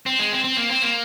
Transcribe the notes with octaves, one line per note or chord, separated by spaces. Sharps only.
C4
G#3
C4
C4
A#3
C4
A#3